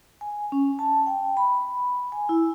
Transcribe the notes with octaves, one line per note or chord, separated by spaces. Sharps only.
G#5
C#4
A5
G5
B5
G#5
E4